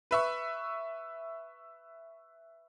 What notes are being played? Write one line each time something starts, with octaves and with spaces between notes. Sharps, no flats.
B4 E5 C#6